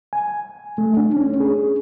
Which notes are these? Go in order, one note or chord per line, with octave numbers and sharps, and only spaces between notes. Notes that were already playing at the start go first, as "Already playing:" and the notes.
G#5
A3
D4
C#4
G#4